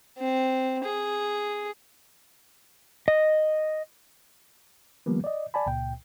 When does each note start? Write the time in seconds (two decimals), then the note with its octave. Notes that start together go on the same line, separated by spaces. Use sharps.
0.18 C4
0.84 G#4
3.08 D#5
5.06 D#3 F3 G3 A#3 B3
5.24 D5 D#5
5.54 D5 G#5 A5 B5
5.66 C#2 A#2 G5